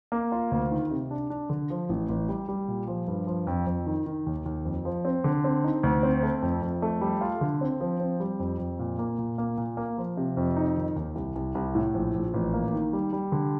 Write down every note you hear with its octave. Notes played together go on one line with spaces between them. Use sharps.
A#3
F4
D2
D#3
C3
D4
D4
D3
F3
A1
A1
G3
G3
A#2
F3
G2
F3
F2
F2
D#3
D#3
D#2
D#2
F2
F3
C4
D3
C4
D#4
D2
C4
A3
F2
F2
A3
G3
F4
D3
C4
F3
C4
G3
F2
F2
A#2
A#3
A#2
A#3
A#2
A#3
F3
C3
F2
D#4
D#3
D#2
C2
C2
C2
A2
A#1
A#1
A1
A#3
D#3
G3
G3
D3